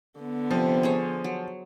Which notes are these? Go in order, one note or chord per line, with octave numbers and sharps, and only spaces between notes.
D3 B3
C3 F3
G#4 C5 C#5
F#3